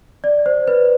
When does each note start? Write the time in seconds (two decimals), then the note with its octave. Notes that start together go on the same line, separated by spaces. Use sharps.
0.24 D5
0.46 C5
0.68 B4